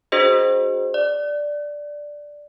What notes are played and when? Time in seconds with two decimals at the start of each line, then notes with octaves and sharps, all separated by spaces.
0.12 D4 F#4 G#4 C5 D#5
0.94 D5